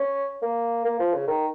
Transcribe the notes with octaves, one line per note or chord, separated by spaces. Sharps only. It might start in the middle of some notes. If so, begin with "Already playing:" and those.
Already playing: C#4
A#3
A#3
F3
C#3
D#3